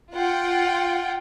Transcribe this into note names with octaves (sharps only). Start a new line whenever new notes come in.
F4 F#5 G5